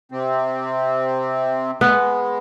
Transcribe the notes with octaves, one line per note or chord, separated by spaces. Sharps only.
C3 C4
G#3 B3